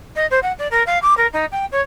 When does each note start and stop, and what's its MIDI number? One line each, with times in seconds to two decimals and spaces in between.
0.15 0.26 75
0.30 0.39 72
0.42 0.52 78
0.58 0.67 74
0.71 0.83 70
0.86 0.98 77
1.02 1.16 86
1.17 1.27 70
1.33 1.45 63
1.51 1.65 79
1.71 1.81 73